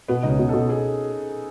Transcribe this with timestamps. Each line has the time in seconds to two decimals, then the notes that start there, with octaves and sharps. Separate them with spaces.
0.08 B2 B3
0.23 C#2 D#4
0.29 C#4
0.39 B2
0.49 A4
0.53 B2
0.69 G#4